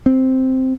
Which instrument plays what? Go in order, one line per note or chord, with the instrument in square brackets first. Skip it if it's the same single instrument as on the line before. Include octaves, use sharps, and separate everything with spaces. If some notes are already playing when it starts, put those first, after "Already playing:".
[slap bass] C4